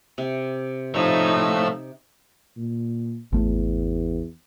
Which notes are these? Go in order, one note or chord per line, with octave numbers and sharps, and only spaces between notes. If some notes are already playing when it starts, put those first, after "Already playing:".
C3
F3 A3 D#4 C#5 E6
A#2
G#1 E2 A3